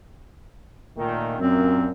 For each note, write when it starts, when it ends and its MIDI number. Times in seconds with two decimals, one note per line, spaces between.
0.97 1.37 46
0.97 1.37 51
0.97 1.37 57
1.39 1.89 42
1.39 1.89 46
1.39 1.90 60